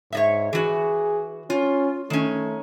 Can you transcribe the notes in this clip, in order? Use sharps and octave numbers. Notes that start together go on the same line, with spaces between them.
G#2 C#5 D#5 E5
E3 F#4 G#4
C#4 F4
D#3 A3 C#4